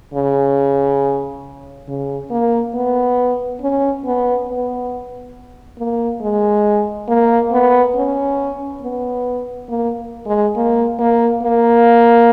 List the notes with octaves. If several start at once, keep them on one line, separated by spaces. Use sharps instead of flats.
C#3
C#3
A#3
B3
C#4
B3
B3
A#3
G#3
A#3
B3
C#4
B3
A#3
G#3
A#3
A#3
A#3